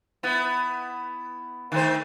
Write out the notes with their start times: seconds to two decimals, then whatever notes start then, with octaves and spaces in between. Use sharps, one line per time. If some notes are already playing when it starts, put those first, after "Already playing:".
0.23 B3 E4
1.72 D#3 A3 C5